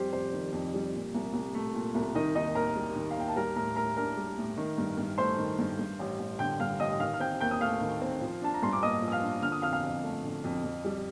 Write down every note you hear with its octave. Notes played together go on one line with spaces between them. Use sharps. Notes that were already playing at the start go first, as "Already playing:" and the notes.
Already playing: F2 G3 G4 C5
F1 C5
D#3
F2
G3
A#2
C2
C2
A3
A#2
C2
D#3 D#4 D#5
D#2 D#4 D#5
D#2 A#4 A#5
G3
D#3
F5
D#2 G5
A5
G3 A#4 A#5
A2 A#4 A#5
A2 A#4 A#5
D4 A#4 A#5
G3
A2
D#3
G2
G2
A3 C5 C6
D#3
G2
G2
A1
A1
D3 G5 G6
G2 F5 F6
A1 D#5 D#6
D#3 F5 F6
F6
C4 G5 G6
D#2 G5 G6
D#6
A3 F5 F6
D#3
C4
F3
D4 A5
A#5
G2 C6
D6
A#3 D#5 D#6
F3
D#6
F5 F6
D4
D3 F6
D#6
F2 F5 F6
F5 F6
F2
A3
D3
F2
F2
G3